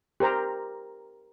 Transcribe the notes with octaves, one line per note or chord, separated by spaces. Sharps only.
G4 A#4 C5 A#5